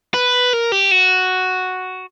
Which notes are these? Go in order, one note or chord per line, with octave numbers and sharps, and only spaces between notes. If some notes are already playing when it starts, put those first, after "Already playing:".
B4
A#4
G4
F#4